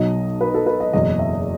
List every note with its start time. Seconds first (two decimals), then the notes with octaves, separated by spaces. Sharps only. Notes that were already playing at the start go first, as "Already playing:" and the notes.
Already playing: B1 B2 F#3 D#5
0.41 B4
0.54 A4
0.66 B4
0.80 D#5
0.93 F#1 E2 B2 F#3 D#5
1.19 E5